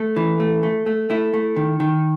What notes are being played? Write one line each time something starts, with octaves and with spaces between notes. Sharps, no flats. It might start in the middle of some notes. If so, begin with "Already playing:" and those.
Already playing: A3
E3
A3
A3
A3
A3 E4
A3
D#3
D#3